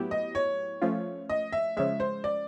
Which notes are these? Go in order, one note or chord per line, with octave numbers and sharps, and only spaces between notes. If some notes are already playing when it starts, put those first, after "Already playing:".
Already playing: A2 F#3 B3 E4 G4
D#5
C#5
F3 A3 C#4 F4
D#5
E5
C#3 F3 G#3 E5
C5
D5